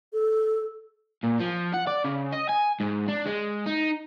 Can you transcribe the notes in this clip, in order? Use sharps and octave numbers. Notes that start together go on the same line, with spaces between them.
A4
A#2
F3
F#5
D5
C#3
D#5
G#5
G#2
D4
G#3
D#4